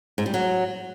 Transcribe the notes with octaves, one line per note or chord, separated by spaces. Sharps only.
G#2
G3
F#3